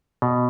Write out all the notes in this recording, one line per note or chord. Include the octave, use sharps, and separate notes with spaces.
B2